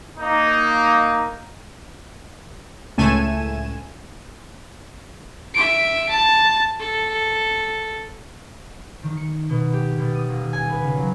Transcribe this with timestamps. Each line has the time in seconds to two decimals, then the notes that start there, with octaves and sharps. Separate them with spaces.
0.19 A#3 D#4
2.98 C#2 A2 A3 G#5 D#7 E7
5.54 E5 D7
6.09 A5
6.80 A4
9.03 D#3
9.17 C#7
9.50 B2
9.73 G4
9.97 B2
10.15 D#6
10.28 D#1
10.53 G#5
10.69 B4
10.82 C#3
10.96 F#3